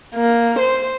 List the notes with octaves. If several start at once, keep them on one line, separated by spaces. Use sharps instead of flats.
A#3
C5